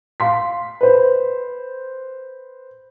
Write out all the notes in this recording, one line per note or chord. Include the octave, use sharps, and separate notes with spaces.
F5 C6 B6
B4 C5